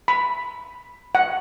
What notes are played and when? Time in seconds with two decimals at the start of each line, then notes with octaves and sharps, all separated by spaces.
0.08 B5
1.15 F#5